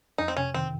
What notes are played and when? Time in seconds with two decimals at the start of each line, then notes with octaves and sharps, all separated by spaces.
0.18 F2 D#4
0.28 C4
0.37 C3 C#4
0.54 D#3 C4